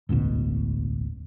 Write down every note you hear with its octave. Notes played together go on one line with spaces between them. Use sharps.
E1 A1 D2 B2